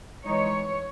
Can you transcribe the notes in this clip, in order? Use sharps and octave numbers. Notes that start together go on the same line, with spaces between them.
E3 G#3 D#4 C#5